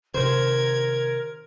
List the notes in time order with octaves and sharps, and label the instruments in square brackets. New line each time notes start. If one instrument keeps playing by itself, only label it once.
[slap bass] C3 D#3 [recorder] A#4 [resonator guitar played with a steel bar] C5 [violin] G#6